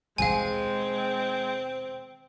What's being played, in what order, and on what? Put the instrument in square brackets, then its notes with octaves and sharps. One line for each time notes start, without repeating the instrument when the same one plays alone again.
[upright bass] D#2 B2 [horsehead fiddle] G#3 [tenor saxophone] C4 [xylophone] F5 G#5